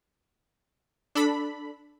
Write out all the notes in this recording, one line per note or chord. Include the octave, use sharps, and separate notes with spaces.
D4 A4 B5